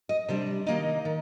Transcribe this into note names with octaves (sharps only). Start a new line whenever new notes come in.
D#5
C3 G3 D4 C5
D#3 A#3 D#4 D#5
D#3